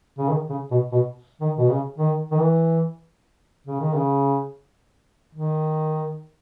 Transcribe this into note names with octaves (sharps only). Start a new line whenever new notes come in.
C#3
D#3
C#3
B2
B2
D#3
B2
C#3
D#3
D#3
E3
C#3
D#3
C#3
D#3